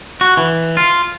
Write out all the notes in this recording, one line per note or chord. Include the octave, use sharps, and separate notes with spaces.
F#4
E3
F4